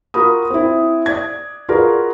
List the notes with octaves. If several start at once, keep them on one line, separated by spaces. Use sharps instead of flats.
F4 F#4 A#4 B5 D#6
C4 E4
D5 G#6
F4 F#4 G#4 A#4 B4 D5